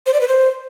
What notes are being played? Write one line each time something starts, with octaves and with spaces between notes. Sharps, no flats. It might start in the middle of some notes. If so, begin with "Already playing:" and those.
C5
D5
B4
C5